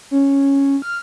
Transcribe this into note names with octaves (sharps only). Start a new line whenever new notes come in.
C#4
F6